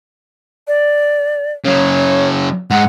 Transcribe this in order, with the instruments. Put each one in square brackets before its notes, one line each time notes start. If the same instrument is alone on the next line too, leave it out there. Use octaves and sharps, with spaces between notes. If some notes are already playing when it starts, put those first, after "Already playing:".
[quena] D5
[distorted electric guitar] C#3 F#3 [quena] C#5
[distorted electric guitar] G#2 G#3 [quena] F#5